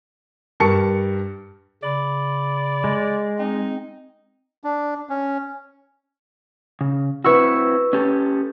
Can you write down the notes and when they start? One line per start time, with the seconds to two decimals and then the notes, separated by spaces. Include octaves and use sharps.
0.60 G2 A#4 A5 C#6 C#7
1.83 C#3 D5 B5
2.84 G#3
3.39 C4 D#4
4.64 D4
5.09 C#4
6.81 C#3
7.24 C4 E4 F#4 B4 C#6 E6
7.93 C#4 G4 A4